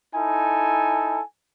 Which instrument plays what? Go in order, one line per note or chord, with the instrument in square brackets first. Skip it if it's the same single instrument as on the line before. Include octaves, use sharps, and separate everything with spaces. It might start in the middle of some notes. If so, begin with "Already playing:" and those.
[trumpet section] D#4 E4 A4 G#5